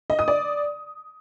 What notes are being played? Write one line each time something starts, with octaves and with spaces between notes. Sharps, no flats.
D#5
D#6
D5